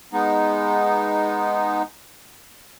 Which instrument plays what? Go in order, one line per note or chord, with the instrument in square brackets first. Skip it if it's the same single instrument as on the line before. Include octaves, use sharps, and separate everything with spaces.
[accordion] G#3 B3 D#4